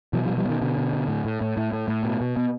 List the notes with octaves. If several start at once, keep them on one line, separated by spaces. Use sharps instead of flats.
B2 E3 F#3
F3 G3
B2
F3 G3
B2 D#3
B2 D3
B2
B2
A2
A2
A2
A2
A2
A2
B2
B2
B2